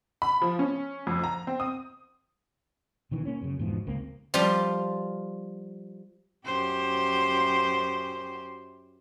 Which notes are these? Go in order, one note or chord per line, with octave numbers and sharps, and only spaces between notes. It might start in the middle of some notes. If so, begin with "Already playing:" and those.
B5
F3
C#4
F2
A#5
C4
D#6
B2 D#3 E3
A#3 C#4
F#2 C#3
E2 G#2 B2 F3
C#2 A#3 C4
F3 G3 F4 G4
F#2 G4 C5